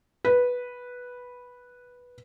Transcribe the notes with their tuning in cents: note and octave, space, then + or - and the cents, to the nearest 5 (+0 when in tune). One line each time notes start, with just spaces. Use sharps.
B4 -5